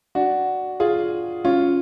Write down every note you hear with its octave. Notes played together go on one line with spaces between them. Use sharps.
D4 F#4
F4 G#4
C#4 F4